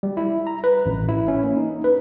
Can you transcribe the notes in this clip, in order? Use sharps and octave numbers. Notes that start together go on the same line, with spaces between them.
G3
E4
A#5
B4
A1
E4
C#4
A#3
D#4
B4